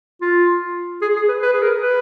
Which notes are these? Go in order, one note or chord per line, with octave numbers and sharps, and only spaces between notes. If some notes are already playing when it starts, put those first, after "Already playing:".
F4
G#4
G#4
B4
B4
G#4
A#4
B4